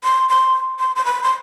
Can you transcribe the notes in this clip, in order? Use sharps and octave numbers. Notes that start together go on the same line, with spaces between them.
C6
C6
C6
C6
B5
C6